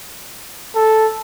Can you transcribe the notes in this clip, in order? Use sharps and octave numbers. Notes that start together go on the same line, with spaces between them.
A4